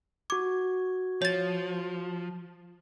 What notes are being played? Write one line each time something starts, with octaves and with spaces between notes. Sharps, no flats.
F#4 D6 G#6
F3 C#5 A6